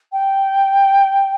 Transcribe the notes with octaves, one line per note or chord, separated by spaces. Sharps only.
G5